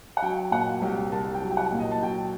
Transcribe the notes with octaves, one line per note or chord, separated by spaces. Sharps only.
F#5
F#3 G5
A#2 F#5
C2 G5
C2 A5
G5
F#3
G5
F#5
A#2
D#5
A5
F#3 G5